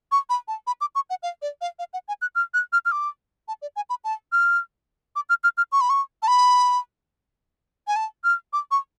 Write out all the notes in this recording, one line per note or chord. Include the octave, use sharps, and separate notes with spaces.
C#6
B5
A5
B5
D6
C#6
F#5
F5
D5
F5
F5
F#5
G#5
F#6
F6
F#6
F6
F6
D6
A5
D5
G#5
B5
A5
F6
D6
F6
F6
F6
C#6
B5
C#6
A5
B5
G#5
A5
F6
D6
C#6